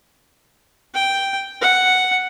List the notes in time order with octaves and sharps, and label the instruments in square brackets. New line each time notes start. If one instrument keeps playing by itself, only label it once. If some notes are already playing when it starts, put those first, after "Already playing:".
[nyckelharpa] G5
F#5